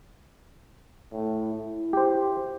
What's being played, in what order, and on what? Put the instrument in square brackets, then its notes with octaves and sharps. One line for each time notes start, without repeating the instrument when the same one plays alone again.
[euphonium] A2
E4
[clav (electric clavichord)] G4 C5